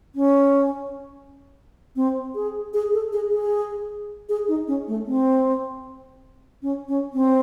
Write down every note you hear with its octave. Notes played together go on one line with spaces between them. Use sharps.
C#4
C4
G#4
G#4
A4
G#4
G#4
G#4
D#4
C#4
A3
C4
C#4
C#4
C4